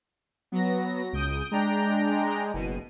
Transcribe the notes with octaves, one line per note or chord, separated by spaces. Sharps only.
F#3 B3 A#6
C#2 D#6 G6 D7
G#3 D4 G5 A#5
F#1 B2 D#7